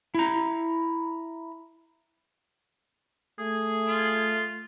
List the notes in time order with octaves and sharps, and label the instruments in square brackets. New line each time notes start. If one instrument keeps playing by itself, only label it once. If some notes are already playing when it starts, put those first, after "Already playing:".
[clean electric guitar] E4 A#5
[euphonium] A3 [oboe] G#4
[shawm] F4